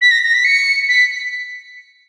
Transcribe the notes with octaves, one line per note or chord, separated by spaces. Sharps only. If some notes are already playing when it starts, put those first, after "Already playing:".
B6
A#6
A#6
B6
C#7
B6